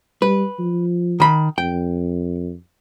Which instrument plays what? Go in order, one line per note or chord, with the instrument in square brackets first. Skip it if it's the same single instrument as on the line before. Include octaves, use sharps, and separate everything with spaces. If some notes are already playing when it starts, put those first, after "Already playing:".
[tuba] G3 [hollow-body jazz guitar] B4
[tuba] F3
[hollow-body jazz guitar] D#3 B5
[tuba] F2 [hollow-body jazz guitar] G5